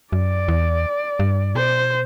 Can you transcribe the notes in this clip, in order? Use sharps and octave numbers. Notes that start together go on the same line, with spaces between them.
F#2 D5
E2
G2
B2 C5